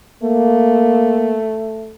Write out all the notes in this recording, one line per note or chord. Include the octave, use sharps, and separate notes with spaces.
A3 A#3